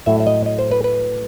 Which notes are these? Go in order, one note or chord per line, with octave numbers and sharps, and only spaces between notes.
A2 F#3 A3 E5
E5
D#5
D#5
C5
B4
B4